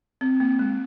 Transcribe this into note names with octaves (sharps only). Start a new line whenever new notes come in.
C4
A#3
G#3